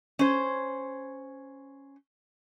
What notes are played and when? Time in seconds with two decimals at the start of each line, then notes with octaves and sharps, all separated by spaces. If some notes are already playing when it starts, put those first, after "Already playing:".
0.19 C#4 C5